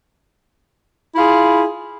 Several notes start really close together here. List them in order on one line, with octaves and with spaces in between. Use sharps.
E4 F4 G#4